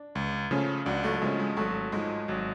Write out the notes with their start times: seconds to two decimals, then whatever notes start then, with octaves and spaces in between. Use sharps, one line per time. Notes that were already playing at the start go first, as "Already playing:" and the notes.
Already playing: D4
0.15 C#2
0.51 C#3 F3 A3 C#4
0.86 C#2 D4 F#4
1.04 F#3 A3
1.21 C#3 F3 G#3 A3 C#4
1.39 G#3
1.57 G#1 F#3 A3
1.92 G#2 F3 G#3
2.28 G#1 F#3